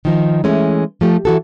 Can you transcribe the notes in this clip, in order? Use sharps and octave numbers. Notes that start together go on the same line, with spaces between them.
D#3 F3 D#4
E3 G#3 A3 C#4
F3 A3 G4
E3 F#4 A4